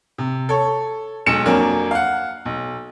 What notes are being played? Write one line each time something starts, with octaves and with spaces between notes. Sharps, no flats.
C3
A4 C#5
B1 G#3 C#7 E7
F2 F#3 A#3 D4 G#5
F5 F#5
B1